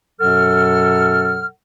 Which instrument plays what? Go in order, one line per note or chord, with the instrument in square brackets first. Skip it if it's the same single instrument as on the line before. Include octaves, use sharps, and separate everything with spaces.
[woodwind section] F#2 B2 F#3 A4 F#5 F6